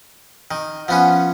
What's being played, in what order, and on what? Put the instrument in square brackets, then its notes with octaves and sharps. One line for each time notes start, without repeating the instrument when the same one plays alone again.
[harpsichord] D#3
[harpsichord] F3 B3 C#4 [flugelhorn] F#5